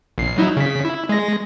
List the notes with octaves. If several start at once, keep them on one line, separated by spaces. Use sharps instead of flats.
A#1 C7
F#3 D#4 E4
C#3 B6
E4
G#3 A#6